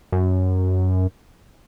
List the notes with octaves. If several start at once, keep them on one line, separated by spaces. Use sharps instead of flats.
F#2